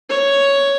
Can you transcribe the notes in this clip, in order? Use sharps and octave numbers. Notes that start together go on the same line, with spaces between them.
C#5